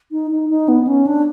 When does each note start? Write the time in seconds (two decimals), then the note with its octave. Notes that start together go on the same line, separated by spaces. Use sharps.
0.12 D#4
0.31 D#4
0.50 D#4
0.68 B3
0.87 C#4
1.07 D4